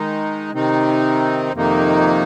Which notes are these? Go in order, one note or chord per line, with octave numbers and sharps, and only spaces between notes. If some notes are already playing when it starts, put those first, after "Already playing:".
Already playing: D#3 G#3 D#4
C3 D#3 C4 D#4
F2 C3 D#3 A#3 D#4